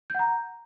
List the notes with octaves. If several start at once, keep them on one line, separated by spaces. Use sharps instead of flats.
F#5 A#5 G6